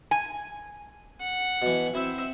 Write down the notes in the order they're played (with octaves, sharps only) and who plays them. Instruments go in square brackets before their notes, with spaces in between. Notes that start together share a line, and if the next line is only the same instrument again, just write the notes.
[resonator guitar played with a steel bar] G#5
[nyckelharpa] F#5
[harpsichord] B2 E3
[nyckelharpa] C4 E5 [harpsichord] E4